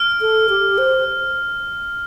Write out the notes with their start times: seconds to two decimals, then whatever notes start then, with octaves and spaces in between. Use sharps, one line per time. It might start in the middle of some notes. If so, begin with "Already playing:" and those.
Already playing: F6
0.21 A4
0.49 G4
0.78 C5